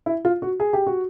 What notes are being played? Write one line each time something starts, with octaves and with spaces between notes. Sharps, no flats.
E4
F4
F#4
G#4
G4
F#4